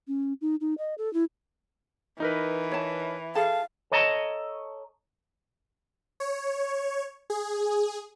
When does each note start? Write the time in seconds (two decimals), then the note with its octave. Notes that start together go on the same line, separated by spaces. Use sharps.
0.08 C#4
0.41 D#4
0.61 D#4
0.78 D#5
0.98 A4
1.14 E4
2.20 E3 D#4 A#4 B4
2.72 C#5 A5
3.35 G#4 A4 F5 A5
3.91 A4 C#5 D#5 A5 A#5
6.20 C#5
7.30 G#4